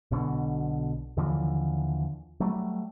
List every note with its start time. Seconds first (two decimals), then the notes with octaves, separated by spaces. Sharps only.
0.11 B1 B2 D3
1.17 D#2 D3 E3 F3
2.40 F#3 G3 A3